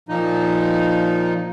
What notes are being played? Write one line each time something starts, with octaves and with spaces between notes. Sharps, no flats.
A#2 F3 D#4